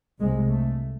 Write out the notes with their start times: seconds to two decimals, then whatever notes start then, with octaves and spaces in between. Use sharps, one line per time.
0.20 C2 C3 G#3
0.49 A3